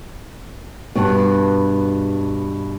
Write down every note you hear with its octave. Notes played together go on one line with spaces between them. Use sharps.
G2 B2